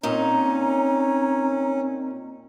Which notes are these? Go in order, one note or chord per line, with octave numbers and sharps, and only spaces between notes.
A#2 C4 C#4 D#4 A#5